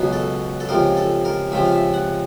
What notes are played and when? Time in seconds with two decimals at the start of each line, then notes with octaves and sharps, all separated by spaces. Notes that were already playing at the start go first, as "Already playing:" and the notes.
Already playing: C#2 B2 F#3 B3
0.13 A4
0.60 A4
0.69 C#2 C3 F3 A#4
0.97 A4
1.25 A#4
1.52 C#2 C3 F3 E5
1.65 F5
1.73 E5
1.94 F#5